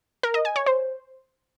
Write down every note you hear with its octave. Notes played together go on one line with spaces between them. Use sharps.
A#4
D#5
G#5
C#5
C5